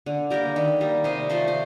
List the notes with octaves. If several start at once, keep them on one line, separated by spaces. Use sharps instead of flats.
D3
G3 A#3 G4 A#4
D#3
G3 A#3
C3 C5 D#5
F3 A3 A4 C5
C5